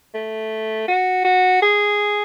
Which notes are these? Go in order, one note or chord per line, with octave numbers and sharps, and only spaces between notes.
A3
F#4
F#4
G#4